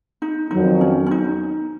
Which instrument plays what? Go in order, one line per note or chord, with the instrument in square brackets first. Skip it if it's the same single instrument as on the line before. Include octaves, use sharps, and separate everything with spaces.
[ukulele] D#4
[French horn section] F2 D#3 F#3 [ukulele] D#4
[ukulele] C#4
C#4
D#4